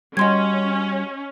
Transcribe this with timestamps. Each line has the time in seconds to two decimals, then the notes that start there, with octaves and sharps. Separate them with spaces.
0.17 G3 C#4 F#4 D#5 C6 G#6